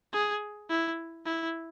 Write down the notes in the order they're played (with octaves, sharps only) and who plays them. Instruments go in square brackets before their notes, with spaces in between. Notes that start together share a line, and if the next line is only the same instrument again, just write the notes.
[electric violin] G#4
E4
E4